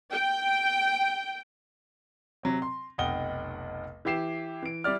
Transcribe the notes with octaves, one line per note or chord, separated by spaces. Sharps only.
G5
C3 F#3 C4
C6
F1 B1 D#5 F#5 G5 G7
E3 E4 G4 C7 E7
E3 D7
G3 E4 G4 D5 F6